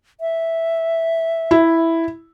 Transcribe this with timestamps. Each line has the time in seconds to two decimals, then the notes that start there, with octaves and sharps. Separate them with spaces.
0.21 E5
1.51 E4